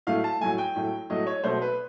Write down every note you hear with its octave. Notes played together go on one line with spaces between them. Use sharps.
A2 F#3 A3 F5
A5
A2 F#3 A3 G#5
G5
A2 F#3 A3
A2 F#3 A3 D#5
C#5
B2 F#3 A3 C5
B4